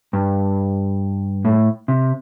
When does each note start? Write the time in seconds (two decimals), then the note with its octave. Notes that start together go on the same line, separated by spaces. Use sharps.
0.13 G2
1.45 A2
1.88 C3